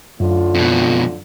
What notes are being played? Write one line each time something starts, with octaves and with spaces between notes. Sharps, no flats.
F#2 A2 D3 F4
F2 B2